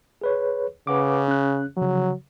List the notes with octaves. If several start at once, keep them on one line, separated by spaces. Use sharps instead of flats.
G#4 B4 C#5
C#3 B4 F#5 D6
C#4 F#6
C#3 F3 F#3